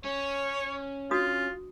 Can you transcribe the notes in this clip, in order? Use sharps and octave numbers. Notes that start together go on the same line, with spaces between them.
C#4 C#5
D4 F4 F#4 D#6